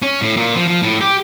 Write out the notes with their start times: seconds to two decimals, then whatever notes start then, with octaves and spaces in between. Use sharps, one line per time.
0.02 C#4
0.22 A2
0.37 A#2
0.56 F3
0.68 F3
0.82 A2
1.01 G4